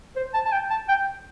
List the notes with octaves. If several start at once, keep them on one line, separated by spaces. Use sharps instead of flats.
C5
A5
A5
G5
A5
G5